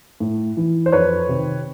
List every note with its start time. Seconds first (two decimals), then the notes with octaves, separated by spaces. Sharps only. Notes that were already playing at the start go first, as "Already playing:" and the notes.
0.20 A2
0.57 E3
0.86 C5
0.92 F2 B4 C#5
1.29 C3 D#3